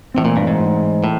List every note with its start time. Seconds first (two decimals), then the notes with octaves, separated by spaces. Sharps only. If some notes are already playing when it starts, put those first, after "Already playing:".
0.14 A2 E3 A3 C4
0.25 A#2
0.37 G2
0.47 G#2
1.04 A2